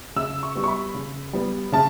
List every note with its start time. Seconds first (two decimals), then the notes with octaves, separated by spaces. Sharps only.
0.16 C#3 E6
0.43 C#6
0.55 G3 B3
0.64 C#6
0.68 B5
0.95 C#3
1.33 G3 B3
1.72 C#3 A5